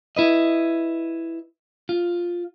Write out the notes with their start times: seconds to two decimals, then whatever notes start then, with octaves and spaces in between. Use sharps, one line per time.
0.17 E4 B4 D#5
1.89 F4